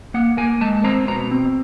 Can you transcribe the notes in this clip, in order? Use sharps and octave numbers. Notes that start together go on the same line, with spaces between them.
A#3 F#5
A#3 G#5
G#3 A5
C4 A#5
B2 A#5
C4